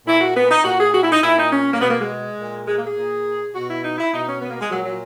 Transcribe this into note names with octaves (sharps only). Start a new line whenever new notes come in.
A#2 E4
F#4
B3
D#4
A#2 F#4
G#4
F#4
E4
D#4
A#2 E4
D#4
C#4
A#3
B2 B3
A#3
G#3
A#2
G#3
A#3
G#4
A#2
B2 F#4
E4
D#4
E4
B2 D#4
C#4
B3
A#3
G#3
A#2 F#3
F#3